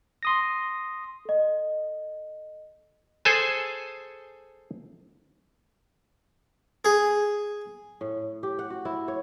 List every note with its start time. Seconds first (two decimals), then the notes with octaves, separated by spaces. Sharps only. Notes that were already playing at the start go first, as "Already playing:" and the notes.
0.23 C6 D#6 A#6
1.25 A4 D#5
3.25 G#4 A4 C5 G#5 A5
6.85 G#4
8.01 A2
8.43 G4
8.59 F#5
8.70 F#4
8.85 E4
9.08 C#5